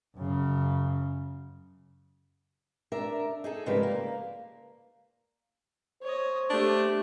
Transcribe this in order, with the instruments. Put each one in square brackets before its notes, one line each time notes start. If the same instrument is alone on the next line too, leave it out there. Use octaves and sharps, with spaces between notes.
[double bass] F#2 C#3
[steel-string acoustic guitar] D4 A#4 E5
D#4 G#4 A4
G#2 C#3 F3 G3 A#4 B4
A#3
[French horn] C5 [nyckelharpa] C#5 D#5
[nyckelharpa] A3 G4 [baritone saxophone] D4